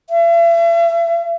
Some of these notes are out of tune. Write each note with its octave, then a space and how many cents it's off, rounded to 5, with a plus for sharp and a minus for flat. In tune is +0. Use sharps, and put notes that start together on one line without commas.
E5 +40